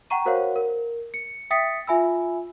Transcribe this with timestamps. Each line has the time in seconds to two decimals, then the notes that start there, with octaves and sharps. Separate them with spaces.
0.10 F#5 G5 A#5 C#6 D#7
0.25 F#4 A#4 C5 C#5 F5 F#5
0.56 A#4
1.14 C#7
1.50 E5 G5 D#6 A6 B6 C#7
1.87 F4 E5 G#5 B5 E6